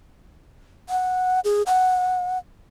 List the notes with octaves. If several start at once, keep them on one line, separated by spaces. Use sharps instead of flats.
F#5
G#4
F#5